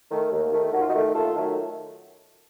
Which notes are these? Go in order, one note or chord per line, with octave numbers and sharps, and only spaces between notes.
D#3 A3
D#2
D#3 A3
D#2 F#4
F4
D#4 F#4
D#3 A3
D#2 F4 A4
D#3 F#3 A3